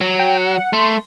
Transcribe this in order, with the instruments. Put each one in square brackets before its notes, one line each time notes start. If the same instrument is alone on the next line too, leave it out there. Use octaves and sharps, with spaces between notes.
[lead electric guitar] F#3
[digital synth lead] G5
F#5
[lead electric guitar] A3 [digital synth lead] C6